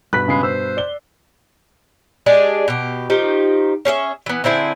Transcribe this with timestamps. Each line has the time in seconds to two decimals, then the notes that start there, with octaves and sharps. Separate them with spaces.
0.13 G2 B2 B4 F#6 B6
0.28 C#3 G#3 B5 C7
0.43 C5 E6
0.77 D5 G7
2.26 G#3 D4 G4 G#4
2.68 B2 G4
3.10 D#3 F3 D#4 G4
3.85 C#4 G#4 C#5 E5
4.26 E3 B3
4.44 D3 C4 E4 G#4